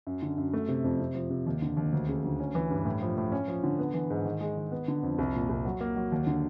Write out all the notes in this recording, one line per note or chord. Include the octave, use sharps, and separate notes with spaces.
F#2
D3
F#2
A3
C3
F2
C3
F3
C3
D#2
D3
D#2
D2
C#3
D2
C#4
E3
G2
A2
F3
A2
C#4
F3
D3
B3
E3
G#2
D#3
G#3
D#3
B3
D3
F2
C2
A#2
C2
F#3
A#3
F#3
D#2
D3